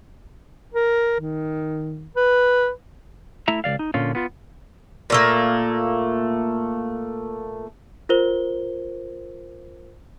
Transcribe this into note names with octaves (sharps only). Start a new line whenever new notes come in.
A#4
D#3
B4
A3 E4 E5 A#5
C#2 D#3 D5 F5
D#4
A#2 D3 C#4 F4
B3 F4
A#2 A3 A#3
F4 A#4 C5 G7